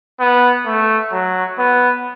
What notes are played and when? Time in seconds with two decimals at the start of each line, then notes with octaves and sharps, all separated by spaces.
0.20 B3
0.66 A3
1.12 F#3
1.58 B3